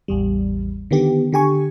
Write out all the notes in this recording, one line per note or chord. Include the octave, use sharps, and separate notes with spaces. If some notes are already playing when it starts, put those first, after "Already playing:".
A1 E2 G3
D3 D#3 B3 G4
D3 G4 G#5 C#6